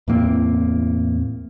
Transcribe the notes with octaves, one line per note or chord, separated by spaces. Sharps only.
E2 A2 A#3 C4